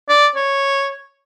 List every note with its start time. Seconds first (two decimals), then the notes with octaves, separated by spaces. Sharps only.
0.09 D5
0.35 C#5